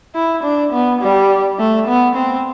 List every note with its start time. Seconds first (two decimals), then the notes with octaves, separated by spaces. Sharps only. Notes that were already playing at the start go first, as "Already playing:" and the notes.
0.15 E4
0.43 D4
0.73 B3
1.01 G3
1.59 A3
1.88 B3
2.15 C4